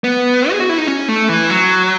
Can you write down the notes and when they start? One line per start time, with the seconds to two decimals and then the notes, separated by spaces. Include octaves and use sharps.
0.04 B3
0.51 G#4
0.60 F#4
0.69 E4
0.78 D#4
0.87 C#4
1.08 A3
1.29 E3
1.50 F#3